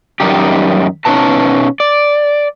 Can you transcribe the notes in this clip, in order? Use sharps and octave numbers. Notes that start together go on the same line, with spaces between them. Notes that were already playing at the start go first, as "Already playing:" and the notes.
F#2 D#3 G3 D#4 G4
B2 C#4 D#4 F#4 B4 A5
D5